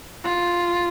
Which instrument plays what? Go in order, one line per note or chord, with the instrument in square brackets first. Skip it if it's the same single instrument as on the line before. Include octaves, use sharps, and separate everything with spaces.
[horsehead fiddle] F4